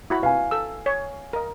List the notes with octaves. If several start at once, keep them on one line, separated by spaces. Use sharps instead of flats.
E4 F#4 B5
B4 F5 G#5
A4 E6
C#5
A#4 D#5